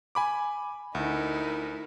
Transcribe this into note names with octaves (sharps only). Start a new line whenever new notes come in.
G#5 B5 D6
D2 D#4 E4 A#4